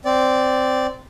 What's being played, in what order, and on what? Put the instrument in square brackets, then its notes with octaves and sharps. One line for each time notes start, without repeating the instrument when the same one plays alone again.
[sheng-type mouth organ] C4 D5